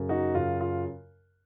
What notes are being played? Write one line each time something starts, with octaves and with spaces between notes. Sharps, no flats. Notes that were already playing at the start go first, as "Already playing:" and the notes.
Already playing: F#2 C#3
D#4 F#4
F#2 C#3 F4
F4